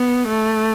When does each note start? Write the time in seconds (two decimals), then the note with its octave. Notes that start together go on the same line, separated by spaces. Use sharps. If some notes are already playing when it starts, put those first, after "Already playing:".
Already playing: B3
0.28 A3